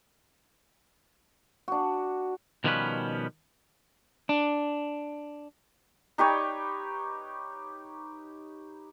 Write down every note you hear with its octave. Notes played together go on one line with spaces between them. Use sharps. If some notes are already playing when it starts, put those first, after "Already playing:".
D4 F#4
B2 D#3 F3 G3 C#4 B4
D4
D#4 G4 B4 C#5